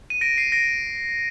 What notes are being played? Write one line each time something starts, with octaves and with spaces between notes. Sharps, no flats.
D#7
A#6 D7
C7 D#7
A#6 D7